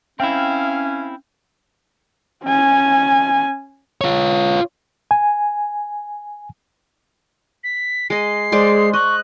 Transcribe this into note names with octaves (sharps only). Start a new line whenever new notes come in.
C4 C#4 E4 F5 G5 E6
C#4 G#5
F4 C#5
G#5
B6
G#3 D#5 C7
G#3 G#4 C5 D5 C6
D#5 C#6 F#6